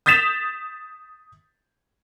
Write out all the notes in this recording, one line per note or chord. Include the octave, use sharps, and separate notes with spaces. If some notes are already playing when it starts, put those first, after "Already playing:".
D#6 G6 A6 B6 E7 F7